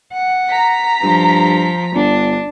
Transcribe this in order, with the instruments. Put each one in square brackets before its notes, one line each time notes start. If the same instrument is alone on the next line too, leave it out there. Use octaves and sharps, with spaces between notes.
[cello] F#5
[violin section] A#5 B6
[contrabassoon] G2 [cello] F3
[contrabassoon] G1 [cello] D4